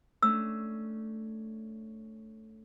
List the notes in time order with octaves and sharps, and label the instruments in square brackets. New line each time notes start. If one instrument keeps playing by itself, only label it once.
[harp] A3 C#4 D4 [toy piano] E6